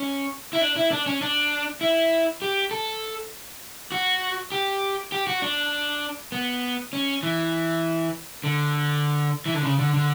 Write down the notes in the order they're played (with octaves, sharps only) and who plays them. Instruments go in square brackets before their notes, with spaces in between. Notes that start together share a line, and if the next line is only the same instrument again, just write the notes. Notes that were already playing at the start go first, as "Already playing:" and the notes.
Already playing: [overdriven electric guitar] C#4
E4
D4
E4
D4
C#4
D4
E4
G4
A4
F#4
G4
G4
F#4
D4
B3
C#4
E3
D3
E3
D3
C#3
D3
D3